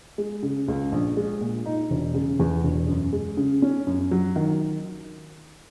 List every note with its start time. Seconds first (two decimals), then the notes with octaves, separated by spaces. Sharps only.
0.18 G#3
0.43 C#3
0.68 C#2
0.92 A#1
1.17 G#3
1.41 A#2
1.66 D#4
1.91 E1
2.14 C#3
2.39 E2
2.64 E1
2.88 F#2
3.13 G#3
3.37 C#3
3.62 C#4
3.87 F#2
4.11 F#3
4.36 D#3